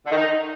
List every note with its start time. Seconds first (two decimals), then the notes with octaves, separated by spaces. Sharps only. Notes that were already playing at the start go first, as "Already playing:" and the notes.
0.06 D3
0.11 D#3
0.17 D#4